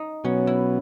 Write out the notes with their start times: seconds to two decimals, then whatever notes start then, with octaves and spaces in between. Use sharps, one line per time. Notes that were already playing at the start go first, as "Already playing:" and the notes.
Already playing: D#4
0.24 B2 F#3 B3 C#4
0.47 E4